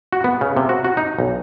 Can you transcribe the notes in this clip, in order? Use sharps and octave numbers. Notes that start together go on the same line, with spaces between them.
F#4
B3
C#3
C3
F#4
F#4
D#4
B1